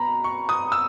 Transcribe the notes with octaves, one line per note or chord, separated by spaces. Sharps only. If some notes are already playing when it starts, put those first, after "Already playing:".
Already playing: B2 A#5 B5
C#6
D#6
E6